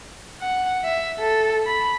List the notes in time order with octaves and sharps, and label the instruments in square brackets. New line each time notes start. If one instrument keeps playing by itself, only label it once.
[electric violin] F#5
E5
A4
B5